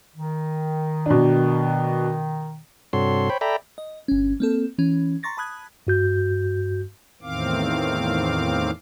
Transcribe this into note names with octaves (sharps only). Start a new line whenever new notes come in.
D#3
B2 D4
G2 C3 F#4 A4 C#5 C6
C5 C#5 G5 B5
A4 D5 E5 G5 A#5 B5
D#5
G1 C#4
A#3 C4 A4
E3 C#4
A#5 C6 C#6 A6 A#6
A5 B5 D#6 F#6 G#6
G2 F#4 G6
E2 A2 D#3 C4 F5 D6